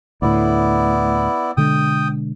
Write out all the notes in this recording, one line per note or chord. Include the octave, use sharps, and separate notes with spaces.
D2 A2 B3 E4 D5
B2 D3 G#3 G5 D#6